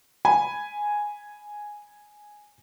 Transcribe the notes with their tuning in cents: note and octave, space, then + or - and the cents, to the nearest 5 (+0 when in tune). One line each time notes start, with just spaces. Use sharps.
G#5 +0 B5 +0